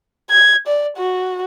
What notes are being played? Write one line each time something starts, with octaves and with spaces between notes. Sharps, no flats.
G#6
D5
F#4